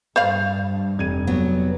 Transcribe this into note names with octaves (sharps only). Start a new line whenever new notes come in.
G2 C5 D5 F5
F1 G#6 D#7
F#3 B3